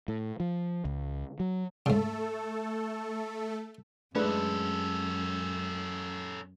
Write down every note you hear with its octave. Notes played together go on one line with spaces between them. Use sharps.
A2
F3
C#2
F#3
G#2 C#3 A3 A4
F#2 G#3 A3 C#4 D4 G#4 A4 B4